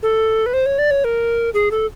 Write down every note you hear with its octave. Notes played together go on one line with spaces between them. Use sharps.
A4
B4
C5
C#5
D5
C#5
A#4
G#4
A4